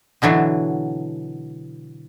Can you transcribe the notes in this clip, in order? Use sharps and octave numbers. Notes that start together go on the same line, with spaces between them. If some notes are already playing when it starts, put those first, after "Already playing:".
B2 D3 E3 F#3